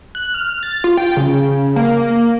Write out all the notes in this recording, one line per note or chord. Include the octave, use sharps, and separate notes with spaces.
F#6
F6
A6
F4
G5
C#3
A#3